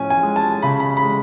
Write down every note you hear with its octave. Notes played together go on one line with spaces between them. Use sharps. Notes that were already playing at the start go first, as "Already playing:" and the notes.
Already playing: A2 F3 C#4 G#5
G#5
G#3
A5
C#3 B5
B5
B5
G#3